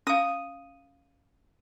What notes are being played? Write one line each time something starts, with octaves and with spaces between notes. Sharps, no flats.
C#4 F5 D#6